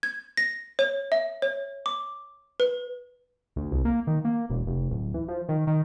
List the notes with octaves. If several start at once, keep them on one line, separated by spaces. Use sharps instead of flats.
G#6
A#6
C#5
E5
C#5
D6
B4
D2
C2
A#3
D#3
A#3
E1
F1
D1
E3
F3
D#3
D#3